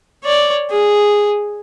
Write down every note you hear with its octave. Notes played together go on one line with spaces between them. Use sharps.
C#5 D5
G#4